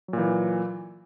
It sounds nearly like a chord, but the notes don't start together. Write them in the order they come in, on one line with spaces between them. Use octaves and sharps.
F#3 A#2 E3